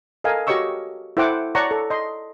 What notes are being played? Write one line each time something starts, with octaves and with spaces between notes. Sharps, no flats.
A4 A#4 D#5 F5 G#5
F#4 G4 C#5 D#5 C#6 E6
E4 A4 C5 F#5 G5 D6
C#5 D5 F#5 A5 A#5 C#6
A4
D#5 C6